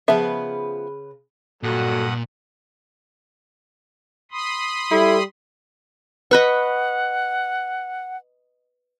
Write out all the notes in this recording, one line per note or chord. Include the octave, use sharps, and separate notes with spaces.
C#3 F3 B3 B4 E5
G2 A#2 F#3 A4 F#5 D#6
B5 C6 D#6
G3 E4 A4
B4 D#5 F#5 B5 C#6 F#6